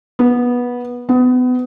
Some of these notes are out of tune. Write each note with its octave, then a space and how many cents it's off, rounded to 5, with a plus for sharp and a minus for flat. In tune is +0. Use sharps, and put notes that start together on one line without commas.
B3 -15
B3 +30